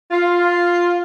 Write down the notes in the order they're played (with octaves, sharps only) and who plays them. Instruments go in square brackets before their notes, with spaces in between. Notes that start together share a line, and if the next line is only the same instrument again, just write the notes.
[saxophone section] F4